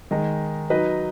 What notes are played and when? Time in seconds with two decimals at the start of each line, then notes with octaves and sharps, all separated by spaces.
0.11 D#3 G#3 D#4
0.70 F#3 D#4 B4 D#5